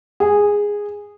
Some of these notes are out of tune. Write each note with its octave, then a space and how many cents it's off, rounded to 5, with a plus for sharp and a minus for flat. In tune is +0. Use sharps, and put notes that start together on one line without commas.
G#4 -10